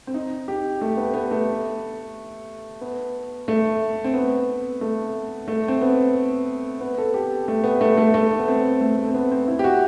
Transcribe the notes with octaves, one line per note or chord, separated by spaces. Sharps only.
C4
D#4
G4
A3
B3
B3
A3
B3
A3
C4
B3
A3
A3
C4
B3
B3
A4
G4
A3
B3
A3
A3
A3
B3
C4
A3
A3
C4
B3
C4
E4
G4
F#4